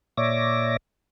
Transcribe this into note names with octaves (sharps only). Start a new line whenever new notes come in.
A#2 C#5 D5 E5 D6 A#6